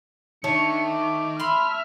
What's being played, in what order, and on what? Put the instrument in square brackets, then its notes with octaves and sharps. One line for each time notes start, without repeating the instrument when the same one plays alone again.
[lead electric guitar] D#3 [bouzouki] A3 C#5 [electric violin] D4 C#7
[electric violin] D6
[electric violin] E5 F6 [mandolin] B5 C6